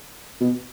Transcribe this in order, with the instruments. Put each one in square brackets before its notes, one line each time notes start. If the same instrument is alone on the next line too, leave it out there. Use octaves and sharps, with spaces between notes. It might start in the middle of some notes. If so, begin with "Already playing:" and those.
[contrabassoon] B2